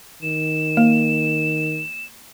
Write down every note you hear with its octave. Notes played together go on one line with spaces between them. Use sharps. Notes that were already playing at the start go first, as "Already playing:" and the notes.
D#3 E7
A#3